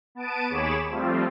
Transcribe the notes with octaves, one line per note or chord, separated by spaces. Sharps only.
B3 A5 D7 D#7
D#2 G#4 C#5 B5 D6 E7
F3 G3 A3 C4 F4